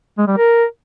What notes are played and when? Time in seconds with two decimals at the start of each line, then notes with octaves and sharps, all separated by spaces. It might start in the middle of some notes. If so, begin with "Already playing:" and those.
0.18 G#3
0.28 G3
0.37 A#4